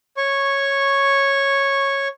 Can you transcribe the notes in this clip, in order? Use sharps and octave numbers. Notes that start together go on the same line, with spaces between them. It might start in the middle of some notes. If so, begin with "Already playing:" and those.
C#5 C#6